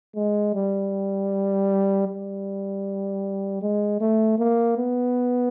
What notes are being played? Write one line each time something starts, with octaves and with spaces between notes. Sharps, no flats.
G#3
G3
G3
G#3
A3
A#3
B3